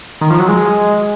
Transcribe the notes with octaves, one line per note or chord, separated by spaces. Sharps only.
D#3
F3
F#3
G#3